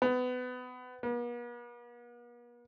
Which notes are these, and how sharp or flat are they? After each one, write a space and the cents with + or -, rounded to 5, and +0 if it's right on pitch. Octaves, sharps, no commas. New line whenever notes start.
B3 +25
B3 -45